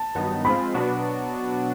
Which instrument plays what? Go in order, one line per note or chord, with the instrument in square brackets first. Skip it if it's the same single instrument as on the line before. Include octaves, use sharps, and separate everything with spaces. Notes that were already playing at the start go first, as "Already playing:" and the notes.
Already playing: [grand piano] A5
[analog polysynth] G2 D#3 F#3 B3 D#4
[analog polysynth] G#2 F3 G#3 C4 F4 [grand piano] B5
[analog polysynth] B2 F#3 B3 D4 F#4